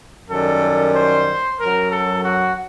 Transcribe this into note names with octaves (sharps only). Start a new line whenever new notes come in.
F#2 D#3 G3 A4
C5
F#2 F#3 A#4
A4
F#4